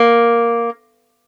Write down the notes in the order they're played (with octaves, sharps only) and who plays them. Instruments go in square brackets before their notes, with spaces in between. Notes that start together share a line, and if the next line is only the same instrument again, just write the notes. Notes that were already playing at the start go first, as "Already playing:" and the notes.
Already playing: [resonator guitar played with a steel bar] A#3